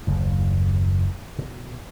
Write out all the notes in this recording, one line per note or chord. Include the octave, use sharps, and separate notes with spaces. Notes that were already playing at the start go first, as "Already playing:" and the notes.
F#1 D#2
B2